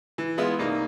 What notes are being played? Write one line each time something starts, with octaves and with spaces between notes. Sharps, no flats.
E3
G#3 B3 E4 F4
C2 A#3 D#4